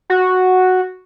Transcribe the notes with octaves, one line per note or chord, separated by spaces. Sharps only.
F#4